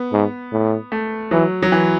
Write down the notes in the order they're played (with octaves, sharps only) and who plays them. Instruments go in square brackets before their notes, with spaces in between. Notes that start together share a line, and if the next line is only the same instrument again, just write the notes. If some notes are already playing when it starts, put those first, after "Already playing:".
Already playing: [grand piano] B3
[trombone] G#2
A2
[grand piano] A3
[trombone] E3 [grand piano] F#3
[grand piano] F#3
E3